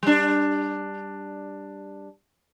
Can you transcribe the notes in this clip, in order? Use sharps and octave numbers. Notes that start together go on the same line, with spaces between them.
G3 D4